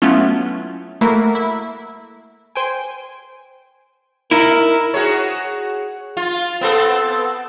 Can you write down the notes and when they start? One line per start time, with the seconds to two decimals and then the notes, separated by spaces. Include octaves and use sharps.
0.02 F#3 A3 B3 C#4 E4 F4
1.01 A3 A#3 E4 F#4 A#4
1.35 E4
2.55 C5 G5 G#5
4.31 D#4 E4 A#4
4.94 F#4 G#4 C#5
6.17 F4
6.61 B3 C4 A4